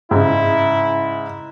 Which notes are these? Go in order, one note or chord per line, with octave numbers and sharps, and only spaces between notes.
G#2 C#3 E4